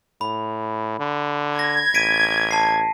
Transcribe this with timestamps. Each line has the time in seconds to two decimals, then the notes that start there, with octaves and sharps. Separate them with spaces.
0.21 A2 B5
0.99 D3
1.59 G#6 A#6
1.94 A1 B6 D7 D#7
2.51 A5 C7